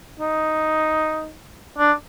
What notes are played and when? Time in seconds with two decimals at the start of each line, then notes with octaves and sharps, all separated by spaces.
0.20 D#4
1.78 D4